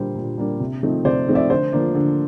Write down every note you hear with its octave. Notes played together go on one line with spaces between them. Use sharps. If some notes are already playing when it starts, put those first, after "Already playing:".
Already playing: A#2 G3 A#3 D4 C5
A#2
G3 A#3 D4
C3
F3 A3 C4 D#4
C3 C5 D5
F3 A3 C4 D#4
D5 E5
D3 C5
F3 A#3 D4
D3